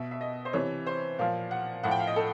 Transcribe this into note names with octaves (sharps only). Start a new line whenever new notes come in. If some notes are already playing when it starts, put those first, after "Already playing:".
Already playing: B2 E5
E5
D#5
C5
C3 E3 C#5
C5
A#2 F3 F5
F#5
A2 F3 F#5
G5
F5
D#5
A4